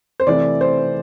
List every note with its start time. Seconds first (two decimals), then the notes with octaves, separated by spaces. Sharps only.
0.20 C5
0.27 C3 E3 A3 D5
0.61 C5